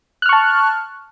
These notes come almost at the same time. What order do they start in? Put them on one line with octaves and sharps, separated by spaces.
F#6 F6 C#6 A5